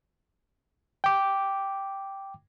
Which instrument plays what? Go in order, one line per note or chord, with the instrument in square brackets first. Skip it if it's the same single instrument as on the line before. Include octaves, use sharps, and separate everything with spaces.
[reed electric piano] G5 D6